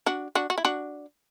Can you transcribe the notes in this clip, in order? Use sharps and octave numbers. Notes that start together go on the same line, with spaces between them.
D4 F#4
D4 F#4
F#4
E4
D4 F#4